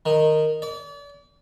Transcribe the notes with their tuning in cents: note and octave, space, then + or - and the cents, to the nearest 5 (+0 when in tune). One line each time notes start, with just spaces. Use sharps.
D#3 -10
D5 -40